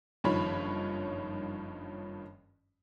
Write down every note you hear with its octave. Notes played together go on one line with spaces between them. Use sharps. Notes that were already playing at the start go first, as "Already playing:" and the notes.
F#1 G2 D#3 F3 C#5 B5